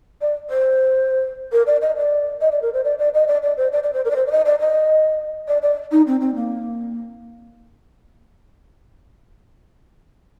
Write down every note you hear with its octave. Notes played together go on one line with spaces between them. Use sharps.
D5
C5
A#4
D5
D#5
D5
D#5
D5
A#4
C5
D5
D5
D#5
D5
D5
C5
D5
D5
C5
A#4
D5
C5
D5
D#5
D5
D#5
D5
D5
D#4
C4
C4
A#3